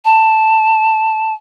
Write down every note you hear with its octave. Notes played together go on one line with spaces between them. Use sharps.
A5